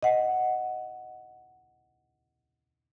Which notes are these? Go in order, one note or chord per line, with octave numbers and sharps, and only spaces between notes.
D#5 F#5